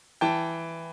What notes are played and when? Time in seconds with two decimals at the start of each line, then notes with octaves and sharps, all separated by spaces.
0.21 E3 G5 A5